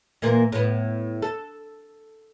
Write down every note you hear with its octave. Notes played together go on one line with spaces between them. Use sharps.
A#2 E3 A#3
A2 B3
A4